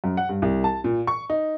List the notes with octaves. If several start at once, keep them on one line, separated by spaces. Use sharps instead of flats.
F#2
F#5
G2
C2
A5
A#2
C#6
D#4